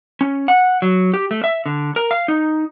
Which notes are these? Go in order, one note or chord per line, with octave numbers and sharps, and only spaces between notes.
C#4
F#5
F#3
G4
A3
E5
D3
A#4
F5
D#4